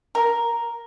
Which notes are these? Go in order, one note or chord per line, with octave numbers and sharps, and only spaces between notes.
A#4